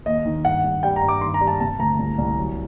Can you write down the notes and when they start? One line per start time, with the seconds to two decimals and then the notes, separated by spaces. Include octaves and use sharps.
0.06 D#2 D#5
0.26 D#3
0.45 G2 F#5
0.64 G2
0.83 G3 G5
0.96 A#5
1.03 G2
1.08 D6
1.21 D#3 C6
1.34 A#5
1.41 G3
1.47 A5
1.60 C3 A5
1.79 D2 A#5
1.99 C2
2.18 C2
2.37 F#3